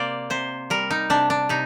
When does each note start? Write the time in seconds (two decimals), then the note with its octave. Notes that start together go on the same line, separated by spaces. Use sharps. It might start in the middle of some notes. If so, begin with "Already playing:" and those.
Already playing: C3 A#3 C5 D5
0.30 C3 C5
0.70 G3 A#4
0.91 D#4
1.10 C3 D4
1.30 D4
1.49 C3 D#4